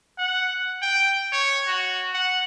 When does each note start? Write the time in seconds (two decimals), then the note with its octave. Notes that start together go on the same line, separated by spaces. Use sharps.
0.18 F#5
0.82 G5
1.32 C#5
1.67 F#4
2.14 F#5